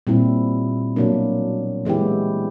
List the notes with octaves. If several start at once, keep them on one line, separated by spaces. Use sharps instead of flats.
A#2 G3 C4 E4
B2 F#3 A#3 D4
E3 G#3 B3 E4 G4